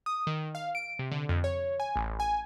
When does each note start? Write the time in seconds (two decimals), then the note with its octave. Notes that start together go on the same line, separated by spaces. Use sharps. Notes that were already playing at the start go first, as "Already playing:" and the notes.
0.06 D#6
0.27 D#3
0.55 F5
0.75 D7
0.99 C3
1.12 D3
1.29 F2
1.44 C#5
1.80 G#5
1.96 A1
2.20 G#5